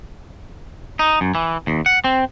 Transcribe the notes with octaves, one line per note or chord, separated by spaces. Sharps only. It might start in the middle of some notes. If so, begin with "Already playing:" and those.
D#4
F#2
E3
D#2
F#5
C4